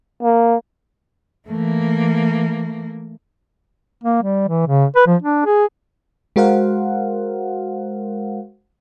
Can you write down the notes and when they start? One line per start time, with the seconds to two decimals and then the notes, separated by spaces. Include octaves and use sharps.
0.23 A#3
1.48 E3 A3 A#3
4.04 A#3
4.23 G3
4.48 E3
4.67 C#3
4.96 B4
5.07 F3
5.22 D4
5.46 G#4
6.36 G#3 F#4 A#4 C5 F5 F#5